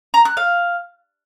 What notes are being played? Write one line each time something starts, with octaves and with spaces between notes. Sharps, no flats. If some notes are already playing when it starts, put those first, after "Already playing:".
A#5
F#6
F5